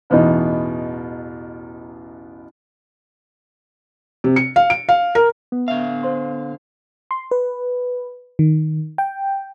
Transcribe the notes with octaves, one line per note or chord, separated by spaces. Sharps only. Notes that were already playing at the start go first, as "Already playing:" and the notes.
A1 E2 B2 D#4
C3
C#7
F5
D7
F5
A#4
B3
D3 E5 F5
C5 C6
C6
B4
D#3
G5